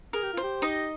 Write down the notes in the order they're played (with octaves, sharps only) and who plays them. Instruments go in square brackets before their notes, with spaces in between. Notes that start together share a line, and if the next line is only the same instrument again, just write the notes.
[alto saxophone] G#4 [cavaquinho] A#4
[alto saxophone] G4
[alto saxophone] F4 [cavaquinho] C5
[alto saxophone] G4
[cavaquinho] D#4 D#5